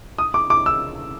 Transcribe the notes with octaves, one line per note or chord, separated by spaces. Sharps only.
D#6
D6
D6
E6